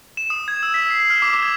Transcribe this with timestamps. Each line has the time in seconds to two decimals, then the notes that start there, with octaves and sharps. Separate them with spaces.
0.17 E7
0.30 D#6
0.48 G#6
0.63 E6
0.74 B6
0.90 C7
1.10 F6
1.22 D6
1.43 G#6